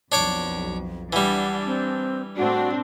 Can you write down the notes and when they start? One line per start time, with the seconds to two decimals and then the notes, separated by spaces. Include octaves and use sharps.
0.12 B1 F2 D4 C#5 D6
1.13 E3 G3 D4 F#5
1.66 C4
2.37 A2 C4 D4 F#4